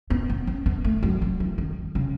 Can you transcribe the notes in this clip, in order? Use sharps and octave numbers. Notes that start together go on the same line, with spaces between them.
B3
B3
C#4
B3
A3
F#3
F#3
E3
D#3
C#3